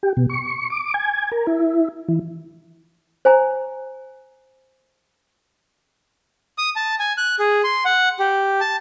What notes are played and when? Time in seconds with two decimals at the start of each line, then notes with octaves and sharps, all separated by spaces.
0.03 G4
0.17 B2
0.29 C#6
0.70 D6
0.94 G#5
1.32 A#4
1.47 E4
2.08 E3
3.25 C5 G#5 A#5
6.58 D#6
6.76 A5
6.99 G#5
7.18 F#6
7.39 G#4
7.64 C6
7.85 F#5
8.19 G4
8.61 A5